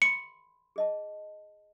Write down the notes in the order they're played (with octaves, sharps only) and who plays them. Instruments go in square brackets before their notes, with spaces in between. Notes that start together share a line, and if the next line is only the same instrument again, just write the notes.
[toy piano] B5 C6 [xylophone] C#7
[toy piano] G#4 D#5 A5